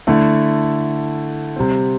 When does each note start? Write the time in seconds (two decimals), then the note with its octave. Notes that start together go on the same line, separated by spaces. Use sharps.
0.07 D3 A3 E4
1.56 C3 G3 C4